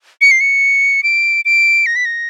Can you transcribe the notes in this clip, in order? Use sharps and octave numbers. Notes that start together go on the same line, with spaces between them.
C#7
C7
C#7
D7
D7
A#6
B6
A#6